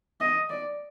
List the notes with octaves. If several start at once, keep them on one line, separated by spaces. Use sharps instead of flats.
D#5
D5